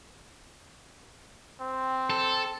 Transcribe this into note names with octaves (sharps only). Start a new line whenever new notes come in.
C4
A4